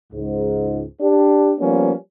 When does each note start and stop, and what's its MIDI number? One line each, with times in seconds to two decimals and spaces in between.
0.13 0.83 37
0.13 0.83 44
1.01 1.54 62
1.01 1.54 67
1.59 1.92 53
1.59 1.92 55
1.59 1.92 58
1.59 1.92 59
1.59 1.92 61